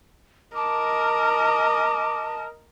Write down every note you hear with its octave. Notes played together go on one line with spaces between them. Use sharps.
A#4 D#5 A5 D6